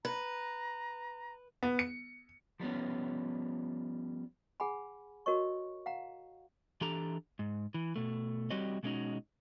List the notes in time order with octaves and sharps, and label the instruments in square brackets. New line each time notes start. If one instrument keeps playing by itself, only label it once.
[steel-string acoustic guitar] B4 [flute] A#5
[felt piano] B3
C#7
[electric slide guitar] F3 G3 B3 C#4
[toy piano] G#4 F#5 G#5 B5
F#4 A#4 C#5 D#5 C#6
F5 F#5 A#5
[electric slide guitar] E3 D4 G4 A4 A#5
G#2
E3
B2 A3
G3 C4 F#4 G4 C#5 D#5
B2 G#3 A3 C#4 D#4 F#4